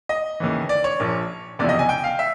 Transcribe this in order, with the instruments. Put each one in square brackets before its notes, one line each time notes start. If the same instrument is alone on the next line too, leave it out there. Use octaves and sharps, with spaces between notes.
[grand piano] D#5
D#2 C#3 E3
D5
C#5
A#1 A#2 F3
F#1 E2 C3 F3 D5
D#5
G#5
G5
F5
E5